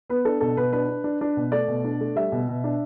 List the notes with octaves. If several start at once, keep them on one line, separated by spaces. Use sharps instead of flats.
B3 B4
D4 A4
B2 A4
B2 B4
D4 B4
D4
D4
D4
B2
A3 D5
B2
D4
A3
G3 E5
B2
B2
D4